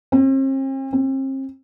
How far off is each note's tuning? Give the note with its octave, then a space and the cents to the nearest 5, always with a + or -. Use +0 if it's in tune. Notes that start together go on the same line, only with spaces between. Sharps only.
C4 +45
C4 +40